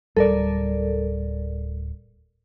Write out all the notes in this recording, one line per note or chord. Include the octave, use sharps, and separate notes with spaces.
D1 G3 A4 A#4 D5